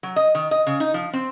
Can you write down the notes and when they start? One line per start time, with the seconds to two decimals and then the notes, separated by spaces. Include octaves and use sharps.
0.03 F#3
0.16 D#5
0.35 D#3
0.51 D#5
0.67 C#3
0.80 D#4
0.94 F3
1.13 C4